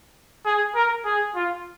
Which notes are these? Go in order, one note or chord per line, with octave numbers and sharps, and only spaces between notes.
G#4
A#4
G#4
F4